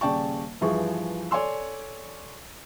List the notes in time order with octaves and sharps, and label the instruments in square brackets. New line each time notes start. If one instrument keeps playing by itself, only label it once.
[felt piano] D#1 C#3 D5 G5 A5 C#6
G2 E3 F3 G#4 C#6
A4 C#5 D5 G#5 C6 E6